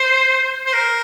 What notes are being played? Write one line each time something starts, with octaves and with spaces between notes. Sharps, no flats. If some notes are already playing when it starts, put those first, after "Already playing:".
Already playing: C5
C5
A#4